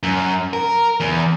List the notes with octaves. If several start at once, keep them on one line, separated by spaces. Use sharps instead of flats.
F#2
A#4
E2